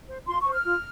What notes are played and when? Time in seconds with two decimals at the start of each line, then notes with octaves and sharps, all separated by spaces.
0.08 C5
0.27 F4 C6
0.39 C#6
0.46 C5
0.51 F6
0.64 F4